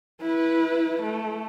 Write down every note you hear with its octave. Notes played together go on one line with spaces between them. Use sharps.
E4 B4
A3